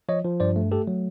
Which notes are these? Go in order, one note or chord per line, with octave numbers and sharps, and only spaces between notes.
F3 C#5 D#5
F3
G2 C5 D5
A3
A3 G4 A4
F#3